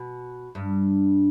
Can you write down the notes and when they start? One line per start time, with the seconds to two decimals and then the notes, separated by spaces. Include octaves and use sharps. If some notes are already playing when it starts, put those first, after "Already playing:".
Already playing: B2
0.55 G2